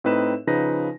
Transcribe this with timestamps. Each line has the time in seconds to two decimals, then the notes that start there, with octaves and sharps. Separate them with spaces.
0.04 A2 C4 D#4 B4 D#5 E7
0.47 C#3 F3 D#4 B4 A#6